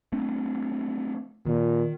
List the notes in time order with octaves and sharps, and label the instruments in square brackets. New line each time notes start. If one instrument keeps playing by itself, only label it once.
[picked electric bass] A3 C4 D4
[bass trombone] A#2 [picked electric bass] D#3